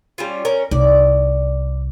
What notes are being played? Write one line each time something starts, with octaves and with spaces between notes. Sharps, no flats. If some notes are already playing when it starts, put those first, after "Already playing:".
G3 C#4 F4
C#4 A#4
C2 D#4 D5